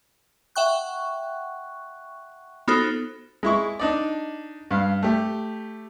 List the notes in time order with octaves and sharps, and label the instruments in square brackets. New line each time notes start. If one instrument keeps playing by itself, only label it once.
[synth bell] E5 F#5 G5 C#6 F#6
B3 D#4 F4 F#4 A4 C5
[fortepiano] G#3 E4 C#6
D4 D#4 D5
G2 F5
A3 G4